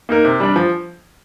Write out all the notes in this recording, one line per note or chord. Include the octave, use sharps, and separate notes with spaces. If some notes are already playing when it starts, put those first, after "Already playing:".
A#3 D#4 A#4
C3
G3 D4
F3